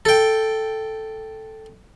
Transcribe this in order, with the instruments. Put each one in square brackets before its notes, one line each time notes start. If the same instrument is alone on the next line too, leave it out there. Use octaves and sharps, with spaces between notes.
[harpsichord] A4 G5